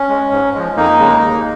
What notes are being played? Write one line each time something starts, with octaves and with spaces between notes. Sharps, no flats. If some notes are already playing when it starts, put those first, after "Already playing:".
Already playing: C#4
G#3
G#2
F3 G#3
F2 A#3 D#4
C#3 G#3
D#2